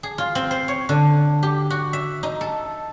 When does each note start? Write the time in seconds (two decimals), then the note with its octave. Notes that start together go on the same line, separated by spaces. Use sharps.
0.03 G#4
0.18 F4
0.35 C4
0.51 C5
0.68 C#5
0.89 D3
1.43 G4
1.70 F#4
1.93 E5
2.23 D#4
2.41 A4